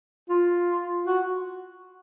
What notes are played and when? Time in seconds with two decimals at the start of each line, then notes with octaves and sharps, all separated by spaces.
0.30 F4
1.06 F#4